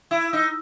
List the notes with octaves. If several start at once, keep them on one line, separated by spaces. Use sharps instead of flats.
E4
D#4